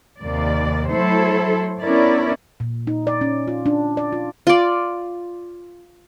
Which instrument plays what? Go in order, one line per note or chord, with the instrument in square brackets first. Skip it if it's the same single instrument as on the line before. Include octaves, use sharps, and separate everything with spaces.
[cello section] D#2 C3 A#3 D5
F#3 A3 E4 A4 C5
B3 C#4 D4 E4 A#4 D5
[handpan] A#2
D#4
D5
C#4
F4
D4
D5
F4
[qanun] F4 D5